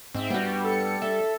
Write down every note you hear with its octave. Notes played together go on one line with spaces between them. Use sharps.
G#2 C4 E5
G2 G3 B3 F#4 G5
A4 C#7
A4 E5